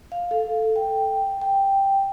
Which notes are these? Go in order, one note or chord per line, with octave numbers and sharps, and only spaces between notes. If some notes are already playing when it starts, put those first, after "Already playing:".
F5
A4
G5
G5